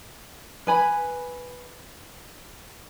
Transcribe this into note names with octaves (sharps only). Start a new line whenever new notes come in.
B4 G#5 B5